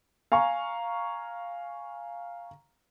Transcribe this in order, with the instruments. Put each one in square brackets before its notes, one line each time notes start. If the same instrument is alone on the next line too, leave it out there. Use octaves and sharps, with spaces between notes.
[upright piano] F5 G#5 A#5 C#6